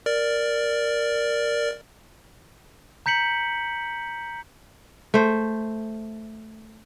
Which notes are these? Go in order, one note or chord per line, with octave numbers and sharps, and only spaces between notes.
A#4 D5
A#5 G6 B6 C#7 F#7
A3 C5